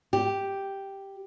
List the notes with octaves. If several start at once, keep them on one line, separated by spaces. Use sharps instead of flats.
G4